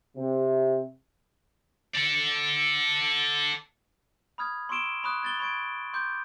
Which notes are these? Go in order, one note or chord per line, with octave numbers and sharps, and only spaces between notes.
C3
A4 D5
B5 D#6 F6 G#6
C6 C#6 E6 D7 E7 G7
B5 C#6 D#6 F#6
G#6 A6 G7
B5 C#6 G#6 D7
C6 D6 G6